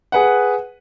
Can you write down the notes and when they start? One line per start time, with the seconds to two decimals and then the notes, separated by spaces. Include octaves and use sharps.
0.12 G#4 B4 F#5